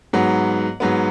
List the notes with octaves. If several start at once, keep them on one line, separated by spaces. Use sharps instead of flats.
G#2 F#3 B3
G#2 F#3 B3